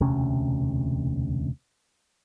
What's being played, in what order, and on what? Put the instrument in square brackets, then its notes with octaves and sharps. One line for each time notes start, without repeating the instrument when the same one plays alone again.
[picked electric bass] E1 D2 C3 C#4